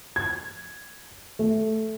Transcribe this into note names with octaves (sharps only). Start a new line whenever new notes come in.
G#6
A3